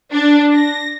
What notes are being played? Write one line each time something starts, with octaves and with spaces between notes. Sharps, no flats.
D4
A#6